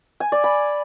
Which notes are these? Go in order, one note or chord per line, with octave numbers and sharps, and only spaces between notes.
G#5
D5
B5